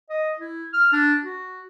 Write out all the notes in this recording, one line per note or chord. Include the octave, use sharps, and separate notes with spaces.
D#5
E4
F6
D4
F#4